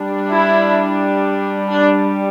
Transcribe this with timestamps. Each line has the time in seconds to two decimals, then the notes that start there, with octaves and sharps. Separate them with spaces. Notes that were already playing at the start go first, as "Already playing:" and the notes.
Already playing: G3 D4
0.30 E4
1.69 D4